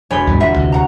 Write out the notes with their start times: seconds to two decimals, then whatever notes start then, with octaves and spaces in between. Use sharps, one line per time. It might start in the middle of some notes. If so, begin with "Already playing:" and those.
0.11 E1 C#5 G#5 B5 G6
0.27 D#2 G#2 G3
0.40 D2 F4 E5 F#5 A#5
0.56 D2 C3
0.72 F#4 F#5 A#5